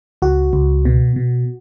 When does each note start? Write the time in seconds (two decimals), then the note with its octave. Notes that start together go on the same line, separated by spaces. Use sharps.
0.22 C#2 F#4
0.53 C#2
0.85 B2
1.16 B2